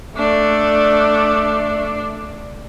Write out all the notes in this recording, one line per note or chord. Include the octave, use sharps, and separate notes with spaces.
A3 D4